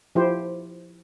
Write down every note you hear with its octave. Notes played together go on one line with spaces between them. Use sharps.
F3 E4 G4 C5